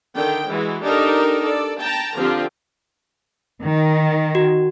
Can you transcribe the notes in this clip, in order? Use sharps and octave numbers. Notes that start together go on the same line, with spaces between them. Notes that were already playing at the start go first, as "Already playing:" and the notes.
D3 D#3 G5
E3 G#3 F#4
D4 D#4 G4 A4 A#4 D5
A4 D5
G5 A5 A#5
D3 F3 C4 F4 G4
D#3
F#4